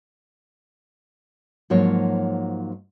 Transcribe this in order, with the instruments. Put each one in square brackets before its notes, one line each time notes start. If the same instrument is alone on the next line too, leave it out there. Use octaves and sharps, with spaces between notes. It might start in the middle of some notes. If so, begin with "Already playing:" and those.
[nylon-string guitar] G#2 F3 F#3 A#3 C#5